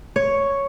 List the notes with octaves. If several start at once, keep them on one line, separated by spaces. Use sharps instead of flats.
C#5